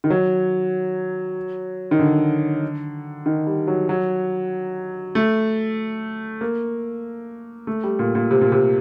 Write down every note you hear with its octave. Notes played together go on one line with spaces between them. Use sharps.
D#3
F#3
D#3
D3
D#3
G3
F#3
F#3
A3
A#3
A3
G3
A#2
A#2
C3
A#2
C3